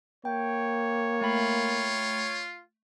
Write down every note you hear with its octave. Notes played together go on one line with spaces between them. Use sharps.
A#3 C#5 G5 G6
A3 F4 G5 B5